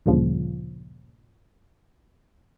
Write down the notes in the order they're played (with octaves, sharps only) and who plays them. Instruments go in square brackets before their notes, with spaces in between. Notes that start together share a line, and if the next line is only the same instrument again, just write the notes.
[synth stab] A1 D2 G2 A#2 C#3 F3